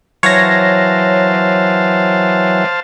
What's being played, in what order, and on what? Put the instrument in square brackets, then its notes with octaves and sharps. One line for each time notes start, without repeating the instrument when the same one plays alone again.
[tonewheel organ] E3 F#3 [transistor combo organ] C5 F5 A5 [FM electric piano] C#5 A#6